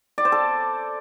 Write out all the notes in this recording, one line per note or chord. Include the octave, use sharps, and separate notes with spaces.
D5
C5
A4